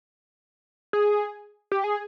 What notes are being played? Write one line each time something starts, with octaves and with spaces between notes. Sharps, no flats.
G#4
G4
G#4